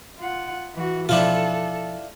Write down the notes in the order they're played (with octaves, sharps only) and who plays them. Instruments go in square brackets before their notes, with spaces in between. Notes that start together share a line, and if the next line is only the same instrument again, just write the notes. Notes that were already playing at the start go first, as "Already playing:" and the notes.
[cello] F4 F#5
E3 F#4
[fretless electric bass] B2 F3 [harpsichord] D4 E4 F4 [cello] A4